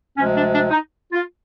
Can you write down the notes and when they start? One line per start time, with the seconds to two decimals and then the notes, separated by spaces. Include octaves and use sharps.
0.17 D2 C3 F3 G#3 C#4
0.35 D4
0.53 D4
0.70 D#4
1.12 F4